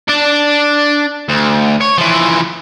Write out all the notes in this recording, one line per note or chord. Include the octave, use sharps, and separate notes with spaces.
D4 D5
D2
C#5
E3 F3